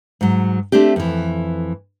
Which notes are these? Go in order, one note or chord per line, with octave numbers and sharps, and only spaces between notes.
G#2 F#3
A3 C4 D4 G4
F2 E3